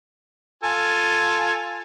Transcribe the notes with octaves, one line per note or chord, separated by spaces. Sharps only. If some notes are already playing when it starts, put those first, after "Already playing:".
F4 A4 G#5